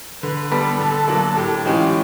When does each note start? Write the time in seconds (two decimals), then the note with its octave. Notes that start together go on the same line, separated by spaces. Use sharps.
0.23 D3 B4
0.51 G3 B3 A4
0.80 D3
1.07 F#3 A#3 D4
1.37 A2 G4
1.65 E3 G#3 C#4 F4 G4